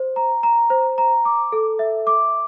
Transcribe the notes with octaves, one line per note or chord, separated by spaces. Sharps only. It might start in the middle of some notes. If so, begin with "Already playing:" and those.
Already playing: C5
A#5
A#5
C5
A#5
D6
A4
E5
D6